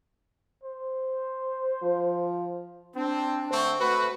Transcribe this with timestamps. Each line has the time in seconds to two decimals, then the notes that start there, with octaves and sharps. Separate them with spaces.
0.63 C5
1.83 F3
2.95 C4 D4
3.51 D3 A3 C4 C5 C#6
3.80 A3 F#4 B4